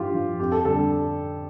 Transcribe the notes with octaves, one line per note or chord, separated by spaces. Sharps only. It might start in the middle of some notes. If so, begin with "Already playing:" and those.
Already playing: G2 F3 F4 G4
F3
F2 G4
A4
D3 G3 A4